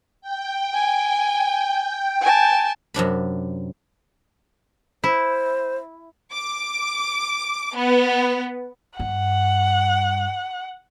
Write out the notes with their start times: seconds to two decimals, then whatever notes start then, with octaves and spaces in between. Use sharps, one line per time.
0.21 G5
0.74 G#5
2.22 G#5 A5
2.94 F#2 C3 D4 B5
5.04 E4 C5
6.32 D6
7.74 B3
8.99 G2 F#5